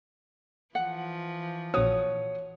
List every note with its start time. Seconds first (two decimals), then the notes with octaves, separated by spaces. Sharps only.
0.75 E3 F3 F#5
1.74 A#1 F#4 C#5 D#6